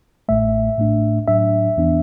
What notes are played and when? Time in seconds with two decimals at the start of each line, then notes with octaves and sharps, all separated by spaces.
0.28 A1 A2 A3 E5
0.78 A2 A3 D4
1.28 A2 F#3 D4 E5
1.77 E2 E3 B3 D4